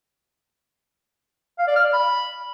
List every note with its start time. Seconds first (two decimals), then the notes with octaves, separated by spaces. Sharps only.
1.59 F5
1.67 D5
1.76 F6
1.84 D5
1.93 B5